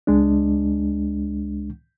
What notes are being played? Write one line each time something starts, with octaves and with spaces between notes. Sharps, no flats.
C#2 G#3 D4